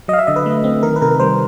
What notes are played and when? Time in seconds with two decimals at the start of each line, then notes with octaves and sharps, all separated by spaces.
0.08 F#3 D#5
0.13 F5
0.19 E5
0.27 D3 D#5
0.36 B4
0.46 A3
0.64 C4
0.83 D#3 A#4
0.96 B4
1.01 C3 A#4
1.20 G3 C5